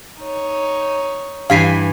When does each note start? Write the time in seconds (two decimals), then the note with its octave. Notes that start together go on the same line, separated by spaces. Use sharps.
0.20 D#4 C#5
1.50 G2 E3 F5 G#5 B6 C7